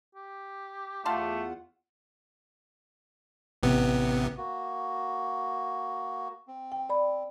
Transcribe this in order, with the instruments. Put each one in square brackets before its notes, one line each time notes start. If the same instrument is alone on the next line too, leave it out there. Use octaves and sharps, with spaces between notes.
[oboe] G4
[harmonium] E2 F4 F#5 [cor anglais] A3 [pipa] F5 A5 C6
[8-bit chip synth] A1 C3 B3
[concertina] A#3 F#4
C4
[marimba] G5
D5 B5